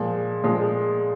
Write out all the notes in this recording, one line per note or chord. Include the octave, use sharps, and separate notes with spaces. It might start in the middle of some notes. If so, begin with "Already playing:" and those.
Already playing: A#2 F3 G#3
A#2 F3 G#3